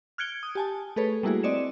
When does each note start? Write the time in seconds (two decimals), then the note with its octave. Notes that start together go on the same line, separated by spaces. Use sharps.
0.18 F6 F#6 G#6 C#7 D7 G7
0.43 D#6
0.55 G4 G#5 A5
0.96 A3 G#4 A4 B4 C#5
1.23 G3 A3 A#3 E4 F#4 G#4
1.43 C4 D5 D#5 C#7 E7